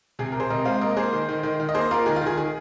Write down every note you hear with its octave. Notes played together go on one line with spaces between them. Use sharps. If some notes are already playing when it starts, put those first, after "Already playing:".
C3 G#4
C3 A#4
G#4 C5
C3 A#4 D#5
G#3 C5 F5
A#3 A#4 D#5
A#3 G#4 C5
D#3
D#3
D#3
D#3
D#5
A#3 G#4 C5
A#3 F4 A#4
D#3 G#4
F4
D#3 G#4
D#3 G#4